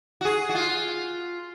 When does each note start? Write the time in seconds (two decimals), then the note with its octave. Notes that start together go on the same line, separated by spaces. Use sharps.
0.21 F#4
0.25 G#4
0.49 F#4
0.55 F4